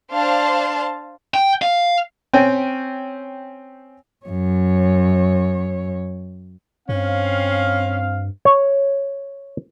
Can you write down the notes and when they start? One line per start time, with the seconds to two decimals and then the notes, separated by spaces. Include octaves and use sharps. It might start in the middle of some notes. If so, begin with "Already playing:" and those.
0.12 D4 C5 F5 A5
1.34 G5
1.62 F5
2.33 C4 C#4 G5 G#5
4.26 F#2 C#5
6.89 G2 C4 C#4 F5
8.45 C#5